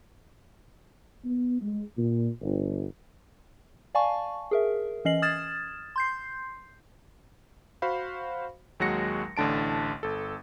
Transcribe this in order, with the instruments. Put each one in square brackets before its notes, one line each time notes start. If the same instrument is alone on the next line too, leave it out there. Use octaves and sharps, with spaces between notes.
[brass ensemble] B3
G#3
A#2
G1
[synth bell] D5 F5 G#5 A5 C#6
G#4 A#4 E5
E3 C#4 D#5 C7 F#7
D#6 F6 G#6 A6 E7
C6 G6 C7
[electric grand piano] F#4 C5 F5 B5
D#2 F#3 G#3 F#4 A#6 C#7
A1 A2 D3 A5 D7
G1 A4